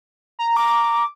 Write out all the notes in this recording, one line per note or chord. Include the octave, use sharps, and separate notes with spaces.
A#5
A#5 D6